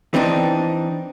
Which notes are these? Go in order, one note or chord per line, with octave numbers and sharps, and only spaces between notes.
E3 C4 D4 D#4